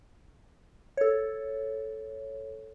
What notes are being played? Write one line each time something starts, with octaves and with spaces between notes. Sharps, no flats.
A4 C#5